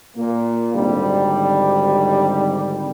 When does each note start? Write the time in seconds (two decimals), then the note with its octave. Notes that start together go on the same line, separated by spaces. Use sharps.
0.16 A#2 A#3
0.75 G#1 D3 G3